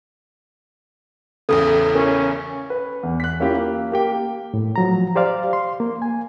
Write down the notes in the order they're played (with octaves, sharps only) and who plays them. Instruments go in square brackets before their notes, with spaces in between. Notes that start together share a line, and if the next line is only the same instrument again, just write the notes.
[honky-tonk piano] A1 E2 C#3 [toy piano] A4
[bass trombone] C#4 [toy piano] A#4
[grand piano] B4
E2
F#6 B6
A#3 C#4 E4 F4 G4
A#3
A#3 G4 G5
[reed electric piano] A2
F3 F#3 A#5
G4 C5 D5 F5
C6
A#3
G#5